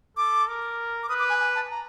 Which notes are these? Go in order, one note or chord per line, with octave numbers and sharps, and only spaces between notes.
A4 D6
A#4
D6
B4 D#6
D6
G#5
G#5
A5
A#5